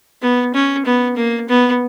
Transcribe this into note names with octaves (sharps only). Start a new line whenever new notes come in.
B3
C#4
B3
A#3
B3